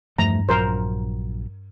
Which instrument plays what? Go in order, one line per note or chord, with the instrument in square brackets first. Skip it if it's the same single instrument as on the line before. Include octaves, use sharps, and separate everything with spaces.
[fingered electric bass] E2 F3 A3 [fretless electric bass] G2 [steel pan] A#5
[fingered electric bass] A#1 F#3 [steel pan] A#4 C5